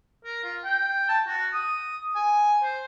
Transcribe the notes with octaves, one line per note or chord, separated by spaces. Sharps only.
A#4
F4
G5
A5
F#4
D#6
G#5
C5